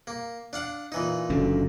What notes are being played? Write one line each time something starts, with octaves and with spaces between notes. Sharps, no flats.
A#3
D4 F5 F#5
A#2 E3 D#4
F#1 F#2 D3